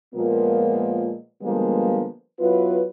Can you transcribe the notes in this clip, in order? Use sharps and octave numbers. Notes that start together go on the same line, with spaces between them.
A#2 F3 G#3 A#3 B3 F4
D3 F3 G3 G#3 A#3 B3
F#3 B3 E4 F4 B4